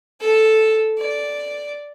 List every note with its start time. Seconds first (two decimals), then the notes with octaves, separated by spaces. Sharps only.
0.20 A4
0.98 D5